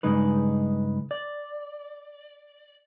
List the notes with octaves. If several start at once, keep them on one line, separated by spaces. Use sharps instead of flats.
G2 C#3 G#3 D#4 B4
D5